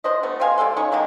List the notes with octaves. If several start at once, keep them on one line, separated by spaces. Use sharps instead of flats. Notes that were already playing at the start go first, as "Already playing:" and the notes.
D4 C5 D#5
A3 B3
C4 D#5 F5 G#5
D3 G#3 A4 C6
C#4 D#4 C#5
D3 D#3 G#3 A#3